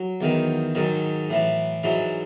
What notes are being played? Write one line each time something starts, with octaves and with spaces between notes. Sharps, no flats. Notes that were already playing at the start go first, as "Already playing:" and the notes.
Already playing: F#3
E2 D#3
G#2 D#3 F#3
A2 E3
G#2 E3 F#3